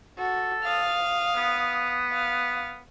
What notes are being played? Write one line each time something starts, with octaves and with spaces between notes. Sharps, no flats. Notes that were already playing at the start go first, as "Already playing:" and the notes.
F#4 A4
F5 D#6
B3
F5